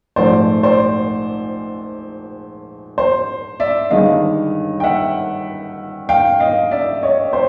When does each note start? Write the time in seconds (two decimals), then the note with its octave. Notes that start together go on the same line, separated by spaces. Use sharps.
0.16 A#1 G#2 F3 A3 C5 D5
0.63 C5 D5
2.98 C5
3.60 D5 E5
3.91 G1 G2 D#3 G#3 D#5 F5
4.80 G5
4.84 E5 F#5
6.09 F5 G5
6.40 D#5 F5
6.71 D5 E5
7.03 C#5 D#5
7.33 C5